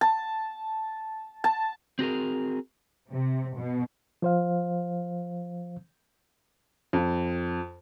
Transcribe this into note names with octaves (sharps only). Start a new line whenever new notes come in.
A5
A5
C4 F#4 G#4 A#4
C3
B2
F3 C5 F5
F2